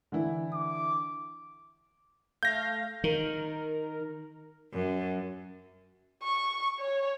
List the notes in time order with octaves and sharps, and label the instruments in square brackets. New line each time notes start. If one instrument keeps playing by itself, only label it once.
[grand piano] D3 E3 E4
[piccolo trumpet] D6
[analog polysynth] A3 F5 [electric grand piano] G6 A#6
[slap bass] D#3 [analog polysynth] A#4
[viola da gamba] F#2
[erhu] C#6
C#5